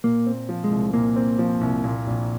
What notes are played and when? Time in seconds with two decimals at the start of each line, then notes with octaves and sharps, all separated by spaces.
0.04 A#2 A#3
0.26 C4
0.49 F3
0.64 G#3
0.71 C2
0.94 A#2 A#3
1.16 C4
1.39 F3
1.61 C2
1.84 A#2
2.07 A#1